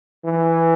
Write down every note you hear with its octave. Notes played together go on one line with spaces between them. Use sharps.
E3